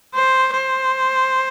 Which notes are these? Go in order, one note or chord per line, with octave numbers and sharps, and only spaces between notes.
C5
C5